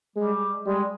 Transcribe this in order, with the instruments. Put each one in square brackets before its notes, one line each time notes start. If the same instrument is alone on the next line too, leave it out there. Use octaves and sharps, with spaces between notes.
[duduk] G3 [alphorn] G#3
[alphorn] G3 [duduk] G#3